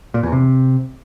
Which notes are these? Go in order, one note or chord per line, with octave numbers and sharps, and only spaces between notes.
A#2
E2
C3